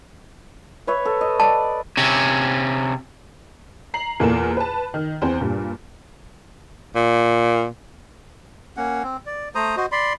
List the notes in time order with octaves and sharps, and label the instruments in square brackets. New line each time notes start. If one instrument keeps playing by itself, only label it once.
[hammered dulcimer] B4 C#5 E5
A4
D#5
[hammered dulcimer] D5 [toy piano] A5
[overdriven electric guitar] C3 C#4
[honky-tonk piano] A#5 C7 F#7
E2 A#2 A#3 A4 A#4 E7
B4 A5
D#3
E2 C4 C5
G2 A#2
[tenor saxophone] A#2
[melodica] A#3 C#4 F#5
C4
D5
A3 C5 A#5 D#6
F#4 C5 D#5
D5 B5 C6